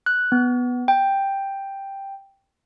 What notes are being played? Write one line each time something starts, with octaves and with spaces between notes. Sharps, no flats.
F#6
B3
G5